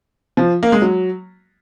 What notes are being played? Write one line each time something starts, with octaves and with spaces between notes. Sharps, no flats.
F3
A#3
G#3
F#3